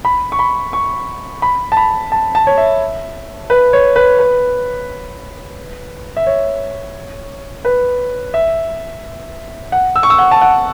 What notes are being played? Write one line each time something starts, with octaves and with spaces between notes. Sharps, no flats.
B5
C#6
B5
C#6
B5
A5
B5
A5
A5
C#5
E5
B4
C#5
B4
B4
E5
C#5
B4
E5
F#5
E6
C#6
E6
F#5
A5
F#5